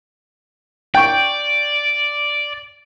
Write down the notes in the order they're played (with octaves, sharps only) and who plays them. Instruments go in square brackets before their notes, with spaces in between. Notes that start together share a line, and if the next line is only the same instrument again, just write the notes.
[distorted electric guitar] D5 [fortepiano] G5 C#6